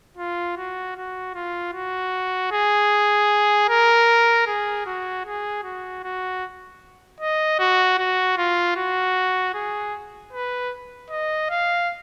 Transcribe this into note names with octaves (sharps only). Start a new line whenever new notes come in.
F4
F#4
F#4
F4
F#4
G#4
A#4
G#4
F#4
G#4
F#4
F#4
D#5
F#4
F#4
F4
F#4
G#4
B4
D#5
F5